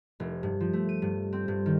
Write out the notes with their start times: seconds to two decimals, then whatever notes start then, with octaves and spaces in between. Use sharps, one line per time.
0.20 F1
0.43 G2
0.61 F3
0.73 A3
0.89 D#7
1.02 G2
1.33 C4
1.48 G2
1.66 D#3